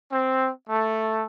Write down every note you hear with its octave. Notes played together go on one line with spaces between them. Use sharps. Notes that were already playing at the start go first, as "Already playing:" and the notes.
C4
A3